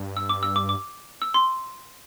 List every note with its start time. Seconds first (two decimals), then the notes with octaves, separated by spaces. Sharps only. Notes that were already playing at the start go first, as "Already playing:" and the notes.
Already playing: G2
0.17 E6
0.29 D6
0.43 E6
0.56 D6
0.69 D6
1.22 E6
1.34 C6